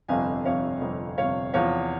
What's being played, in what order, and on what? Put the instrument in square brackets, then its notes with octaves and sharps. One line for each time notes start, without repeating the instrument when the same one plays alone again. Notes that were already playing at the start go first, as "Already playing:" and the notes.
[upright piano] G1 F2 C3 F5 G#5
G1 F2 C3 C#5 F5
G1 F2 C3
G1 F2 C3 C#5 F5
E2 C3 F3 C#5 F5